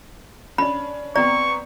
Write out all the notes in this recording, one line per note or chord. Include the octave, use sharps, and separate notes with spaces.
C#4 D4 B5
B3 C4 D5 A#5 C#6